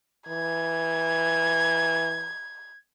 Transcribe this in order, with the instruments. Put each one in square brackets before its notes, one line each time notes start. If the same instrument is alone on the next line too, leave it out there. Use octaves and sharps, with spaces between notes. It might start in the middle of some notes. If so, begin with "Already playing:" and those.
[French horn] E3 [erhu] G#6